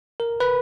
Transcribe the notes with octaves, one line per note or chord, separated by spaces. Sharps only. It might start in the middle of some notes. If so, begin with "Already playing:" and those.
A#4
B4